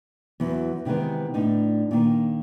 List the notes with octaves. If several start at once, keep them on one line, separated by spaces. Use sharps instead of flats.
E2 E3 F#3
C3 D#3 E3 G#3 B3
A2 D3 D#4
A#2 D#3